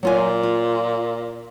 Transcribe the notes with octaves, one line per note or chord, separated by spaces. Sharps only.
A#2 F#3 F4 G#5
F4